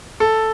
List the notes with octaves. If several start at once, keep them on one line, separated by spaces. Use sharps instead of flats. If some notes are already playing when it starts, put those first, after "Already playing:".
A4